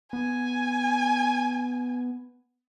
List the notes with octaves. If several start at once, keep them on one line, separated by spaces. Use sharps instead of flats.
B3 G#5